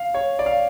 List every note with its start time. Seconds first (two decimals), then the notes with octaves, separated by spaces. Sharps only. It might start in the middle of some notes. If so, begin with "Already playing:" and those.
Already playing: F5
0.14 C#5
0.39 D5
0.46 F5